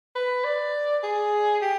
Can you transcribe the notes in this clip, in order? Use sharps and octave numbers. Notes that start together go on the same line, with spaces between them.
B4
D5
G#4
G4